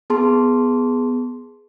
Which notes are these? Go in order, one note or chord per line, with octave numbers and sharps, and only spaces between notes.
B3 G#4 A5 C6